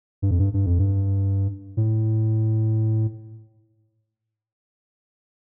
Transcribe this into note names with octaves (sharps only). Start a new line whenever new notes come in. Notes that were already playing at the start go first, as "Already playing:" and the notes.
G2
F2
G2
G2
F2
G2
A2